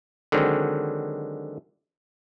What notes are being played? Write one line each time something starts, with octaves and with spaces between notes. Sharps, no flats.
D3 D#3 F#3 G#3 C4